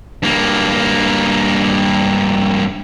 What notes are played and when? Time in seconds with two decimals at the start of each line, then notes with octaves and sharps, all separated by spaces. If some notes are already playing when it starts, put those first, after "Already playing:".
0.23 G2 A#3